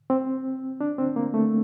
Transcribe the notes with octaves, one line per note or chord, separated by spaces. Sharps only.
C4
D4
C4
A#3
A3